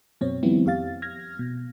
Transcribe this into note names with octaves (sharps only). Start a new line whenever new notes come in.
F#2 B2 C4 C#5
D#3 F3 G3 B3 C4 E4
F2 G4 F5 A6
F6 G#6 A#6
B2